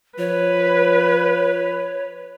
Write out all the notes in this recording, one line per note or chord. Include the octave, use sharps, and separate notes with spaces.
F3 B4 C#5